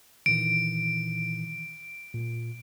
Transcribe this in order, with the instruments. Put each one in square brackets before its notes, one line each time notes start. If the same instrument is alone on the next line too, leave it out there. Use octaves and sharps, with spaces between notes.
[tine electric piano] A#2 D#3 E3 [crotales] D7
[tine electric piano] A#2